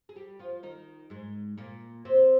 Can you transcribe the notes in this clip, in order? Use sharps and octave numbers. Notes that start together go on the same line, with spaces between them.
G#4
G3 G4
F3 F4
D#3 D#4
G#2 G#3
A#2 A#3
C3 C4